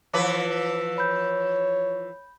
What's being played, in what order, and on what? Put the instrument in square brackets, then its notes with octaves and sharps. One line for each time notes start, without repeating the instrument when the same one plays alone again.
[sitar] E3 F3 B4 [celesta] C#5 D6
[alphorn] C#5 [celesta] B5 G6